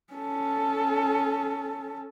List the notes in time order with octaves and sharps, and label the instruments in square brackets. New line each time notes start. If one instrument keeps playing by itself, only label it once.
[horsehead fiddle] C#4 A4